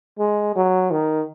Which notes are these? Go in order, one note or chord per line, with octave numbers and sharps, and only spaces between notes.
G#3
F#3
D#3